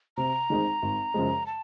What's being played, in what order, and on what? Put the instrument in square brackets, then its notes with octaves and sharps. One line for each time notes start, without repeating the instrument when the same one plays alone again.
[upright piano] C3 [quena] A#5
[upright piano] D#3 G#3 C4 D#4
G#1
F#2 C#3 F3 G#3
[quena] A5